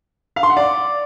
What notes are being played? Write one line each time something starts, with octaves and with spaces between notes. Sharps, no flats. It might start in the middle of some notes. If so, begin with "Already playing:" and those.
F5
C6
F#5
D5